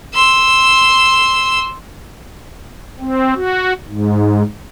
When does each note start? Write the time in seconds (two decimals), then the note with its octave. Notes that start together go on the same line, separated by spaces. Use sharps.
0.14 C6 E6
2.99 C4
3.35 F#4
3.87 G#2